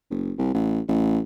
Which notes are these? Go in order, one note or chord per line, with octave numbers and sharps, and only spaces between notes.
F#1
C2
A1
A1